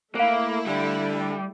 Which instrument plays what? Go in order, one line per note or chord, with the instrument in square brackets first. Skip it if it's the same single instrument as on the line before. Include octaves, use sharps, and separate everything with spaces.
[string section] A3 E4 [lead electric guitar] A#3 [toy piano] C5 F5
[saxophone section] D3 [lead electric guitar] G3